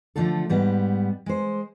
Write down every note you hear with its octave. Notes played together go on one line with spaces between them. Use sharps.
D3 F3 F#3 A3 F4 A4
G#2 G3 B3
G#3 C5